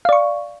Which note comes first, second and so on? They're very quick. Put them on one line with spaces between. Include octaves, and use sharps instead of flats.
F5 D5 C#6